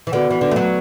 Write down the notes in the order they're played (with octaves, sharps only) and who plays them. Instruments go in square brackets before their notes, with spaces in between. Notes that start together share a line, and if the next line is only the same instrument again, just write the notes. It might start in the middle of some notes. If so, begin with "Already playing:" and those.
[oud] E3
[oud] D3 [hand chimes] B3 F#4 B4 D5 F#5
[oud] E3
D3
A3
F#3